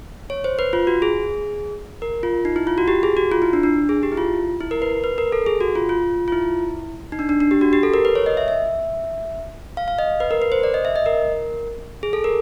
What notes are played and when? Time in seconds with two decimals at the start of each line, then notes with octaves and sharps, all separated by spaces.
0.30 C#5
0.44 C5
0.59 B4
0.73 F4
0.87 F#4
1.02 G#4
2.02 A#4
2.23 F4
2.45 D#4
2.56 E4
2.67 F4
2.78 F#4
2.88 G4
3.03 G#4
3.17 F#4
3.32 F4
3.42 E4
3.53 D4
3.63 D4
3.89 G#4
4.03 G4
4.12 E4
4.17 F4
4.60 E4
4.71 A#4
4.82 B4
5.04 B4
5.18 A#4
5.32 A4
5.46 G#4
5.61 F#4
5.75 F4
5.89 F4
6.28 F4
6.32 E4
7.12 D#4
7.19 D4
7.29 D4
7.40 D4
7.51 G4
7.61 F#4
7.73 G4
7.83 A4
7.94 A#4
8.05 B4
8.15 C#5
8.26 D#5
8.37 E5
8.48 E5
9.77 F5
9.88 F5
9.99 D#5
10.20 B4
10.31 A#4
10.42 B4
10.52 C5
10.63 D5
10.74 D#5
10.85 E5
10.96 D#5
11.06 A#4
12.03 G#4
12.13 A4
12.24 A#4